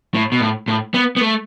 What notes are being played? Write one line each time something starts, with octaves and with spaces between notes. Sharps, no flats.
A2
B2
A2
A2
B3
B3
A3